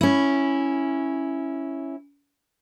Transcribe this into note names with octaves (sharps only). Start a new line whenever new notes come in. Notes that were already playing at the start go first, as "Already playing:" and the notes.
C#4 E4